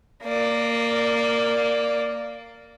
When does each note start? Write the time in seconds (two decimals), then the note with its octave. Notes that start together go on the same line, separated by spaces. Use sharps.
0.25 A#3 D5